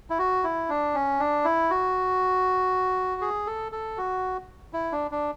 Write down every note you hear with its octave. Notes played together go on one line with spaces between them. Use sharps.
E4
F#4
E4
D4
C#4
D4
E4
F#4
G#4
A4
A4
F#4
E4
D4
D4